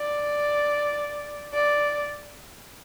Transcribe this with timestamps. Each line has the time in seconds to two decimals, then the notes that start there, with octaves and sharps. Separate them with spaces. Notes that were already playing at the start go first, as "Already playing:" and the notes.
Already playing: D5
1.53 D5